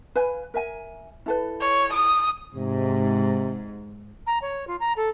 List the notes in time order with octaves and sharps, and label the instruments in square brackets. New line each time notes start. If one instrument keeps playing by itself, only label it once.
[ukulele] B4 F5 G#5
A#4 E5 G#5
E4 A4 B4
[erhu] C#5
D#6
[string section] G#2 [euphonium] C3
[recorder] A#5
C#5
F4
A#5
A4